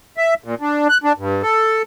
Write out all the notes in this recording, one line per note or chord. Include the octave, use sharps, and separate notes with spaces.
E5
A#2
D4
F#6
D4
G2
A4